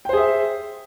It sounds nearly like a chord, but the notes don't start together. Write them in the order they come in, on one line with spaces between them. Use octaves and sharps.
G5 C5 G#4 E5